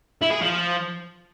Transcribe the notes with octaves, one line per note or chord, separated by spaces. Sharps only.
E4
G#4
F3